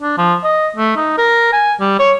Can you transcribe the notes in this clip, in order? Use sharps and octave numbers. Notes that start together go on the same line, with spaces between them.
D4
F3
D#5
A3
D#4
A#4
G#5
G3
C#5